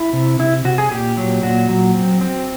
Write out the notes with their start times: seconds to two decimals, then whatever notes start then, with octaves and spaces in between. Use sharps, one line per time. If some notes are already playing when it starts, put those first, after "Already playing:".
Already playing: E4
0.13 C3
0.39 C3 E4
0.65 C3 F#4
0.78 G#4
0.91 A#2 G4
1.17 F#3
1.43 A#2 F#4
1.69 F#3
1.94 C4
2.21 C4